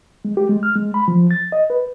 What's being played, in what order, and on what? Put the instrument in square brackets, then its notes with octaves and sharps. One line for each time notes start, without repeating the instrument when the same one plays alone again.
[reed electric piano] G#3
G4
G#3
F6
G#3
B5
F3
A6
D#5
B4